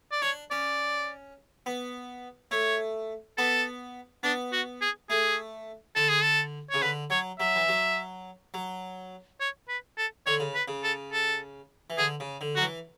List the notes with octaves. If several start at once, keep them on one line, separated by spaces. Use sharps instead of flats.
D5
D4 C#5
C#4 D5
B3
A3 C#5
B3 A4
B3 D4
F#4
G#4
A3 G#4
D3 A4
G#4
A4
C#3 C#5
D3 B4
F#3 C#5
F#3 E5
E3
F#3
F#3
C#5
B4
A4
D3 C#5
C#3
B4
C#3
A4
A4
E3
D3 G#4
C#3
D3
F#3 F#4
E3